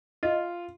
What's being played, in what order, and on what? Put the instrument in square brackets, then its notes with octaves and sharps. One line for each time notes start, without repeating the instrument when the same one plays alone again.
[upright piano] F4 [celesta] D#5